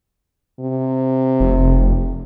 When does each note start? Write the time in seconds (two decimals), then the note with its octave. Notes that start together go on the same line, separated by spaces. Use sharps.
0.60 C3
1.40 F1